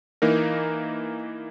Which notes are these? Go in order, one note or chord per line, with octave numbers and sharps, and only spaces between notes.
E3 A#3 D#4 A#4